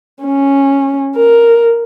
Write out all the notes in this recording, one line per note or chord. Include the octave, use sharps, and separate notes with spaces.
C#4
A#4